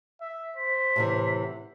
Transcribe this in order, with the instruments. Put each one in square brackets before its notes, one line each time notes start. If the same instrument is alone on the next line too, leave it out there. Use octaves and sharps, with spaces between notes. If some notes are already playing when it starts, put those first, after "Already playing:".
[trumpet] E5
[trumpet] C5 [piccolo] B6
[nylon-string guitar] A2 C3 E3
[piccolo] F#5